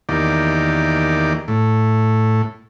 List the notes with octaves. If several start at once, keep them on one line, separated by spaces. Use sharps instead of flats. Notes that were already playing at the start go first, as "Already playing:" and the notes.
E2 D#3 A#3 G4 D5
A2